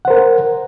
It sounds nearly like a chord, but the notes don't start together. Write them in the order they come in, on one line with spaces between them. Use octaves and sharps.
F#5 C5 A#4